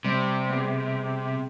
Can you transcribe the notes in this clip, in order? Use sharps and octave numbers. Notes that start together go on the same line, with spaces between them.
C3 G3
B3 G#4